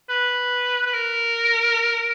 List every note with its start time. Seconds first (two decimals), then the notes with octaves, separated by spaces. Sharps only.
0.09 B4
0.86 B4
0.94 A#4